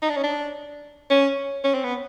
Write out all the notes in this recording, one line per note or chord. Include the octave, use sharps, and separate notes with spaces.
D#4
D4
C#4
D4
C#4
C#4
C4
B3